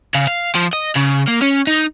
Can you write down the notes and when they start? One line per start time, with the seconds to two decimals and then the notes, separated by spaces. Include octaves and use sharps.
0.15 C#3
0.27 F5
0.55 F3
0.73 D#5
0.95 C#3
1.27 A#3
1.42 C#4
1.67 D#4